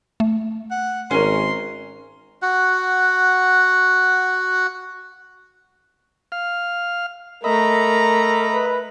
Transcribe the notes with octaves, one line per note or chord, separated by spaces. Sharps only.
A3
F#5
G#1 C#4 A#4 C6
F#4 F#5
F5 F6
A3 A#4 D#5 E5 A#5 B5
B4